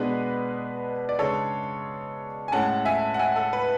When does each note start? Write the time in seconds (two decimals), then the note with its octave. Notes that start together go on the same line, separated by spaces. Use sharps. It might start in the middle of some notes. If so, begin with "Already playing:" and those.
Already playing: B2 G#3 B3 D4 B4
1.09 D5
1.19 C#3 G#3 D4 A4 C#5
2.48 G#5
2.52 A2 G#3 C#4 F#5 A5
2.85 E5 G#5
3.14 F#5
3.19 E5 G#5
3.36 A4
3.53 B4